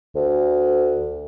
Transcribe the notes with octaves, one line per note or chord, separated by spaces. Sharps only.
D2